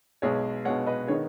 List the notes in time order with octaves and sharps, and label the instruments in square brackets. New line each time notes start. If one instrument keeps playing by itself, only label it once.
[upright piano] B1 B2 G#3 G#4 C#5
B1 B2 G#3 C#5 F#5
B4 D#5
D#3 B3 D#4 G#4 C#5